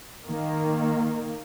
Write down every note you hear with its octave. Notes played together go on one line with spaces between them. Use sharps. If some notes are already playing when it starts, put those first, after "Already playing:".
D#3 A#3